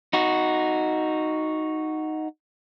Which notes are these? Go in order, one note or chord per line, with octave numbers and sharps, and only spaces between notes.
D#4 F#4